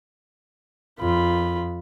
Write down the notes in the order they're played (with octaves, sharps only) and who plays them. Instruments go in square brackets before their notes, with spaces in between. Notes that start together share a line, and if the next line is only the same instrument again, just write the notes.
[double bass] F2 [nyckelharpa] F4 B5